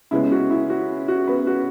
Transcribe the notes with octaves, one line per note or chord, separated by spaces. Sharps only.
C#3 G#3 B3 E4
F#4
E4
F#4
F#4
B3 B4
F#4